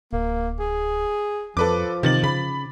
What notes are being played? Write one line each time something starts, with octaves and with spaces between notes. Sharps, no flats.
D1 A#3
G#4
F2 F3 A4 B4 D6
C3 D#3 A6 F#7
C#3 B5